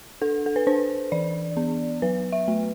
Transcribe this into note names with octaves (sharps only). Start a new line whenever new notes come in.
D4 A4
A4
B4
D4 C5
E3 D5
B3
F#3 B4
E5
A3